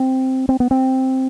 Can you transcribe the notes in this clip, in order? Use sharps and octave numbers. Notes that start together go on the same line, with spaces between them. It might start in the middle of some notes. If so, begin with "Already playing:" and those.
Already playing: C4
C4
B3
C4